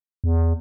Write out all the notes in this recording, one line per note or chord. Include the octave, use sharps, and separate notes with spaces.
E2